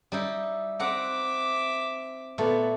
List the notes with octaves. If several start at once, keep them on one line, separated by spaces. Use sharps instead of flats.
G3 D#4 E4
C4 E5 F#5 A#5 D6
A#2 A3 B3